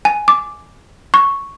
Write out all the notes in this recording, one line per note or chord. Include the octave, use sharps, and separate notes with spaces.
G#5
D6
C#6